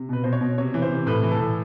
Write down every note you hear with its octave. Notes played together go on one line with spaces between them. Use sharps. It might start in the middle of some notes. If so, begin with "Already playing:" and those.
Already playing: C3
B2 B4
B2 C5
C#5
B2
C3 C#5
E3
C5
C3
A2 B4
E3
A4
A2